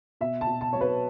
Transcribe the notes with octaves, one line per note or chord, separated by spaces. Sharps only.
B2 E5
A5
B2
A5
F#3 C#5
B4